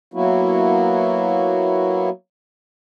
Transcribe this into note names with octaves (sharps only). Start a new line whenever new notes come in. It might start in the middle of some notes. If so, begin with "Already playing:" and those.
F#3 A#3 B3 E4 F#4